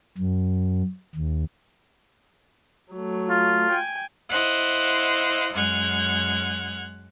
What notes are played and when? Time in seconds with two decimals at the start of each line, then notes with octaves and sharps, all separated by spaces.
0.18 F#2
1.15 D#2
2.93 F#3 A3
3.29 F4
3.72 G5 G#5
4.30 E4 C5 D#5 F5 F#5
5.53 F#2 G#3 F#5 F6 G#6